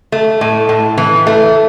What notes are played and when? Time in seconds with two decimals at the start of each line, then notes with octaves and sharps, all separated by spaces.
0.12 A3
0.41 A2
0.69 A2
0.98 E3
1.27 A3